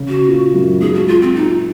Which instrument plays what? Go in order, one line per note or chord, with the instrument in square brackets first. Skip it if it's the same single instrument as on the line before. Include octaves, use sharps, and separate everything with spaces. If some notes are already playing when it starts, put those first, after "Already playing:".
Already playing: [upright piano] C#3
[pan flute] F#4
[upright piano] A#2
F#2
[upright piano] G#2 [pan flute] G#4
[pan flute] F#4
F4
C4
[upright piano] A#2 [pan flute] D#4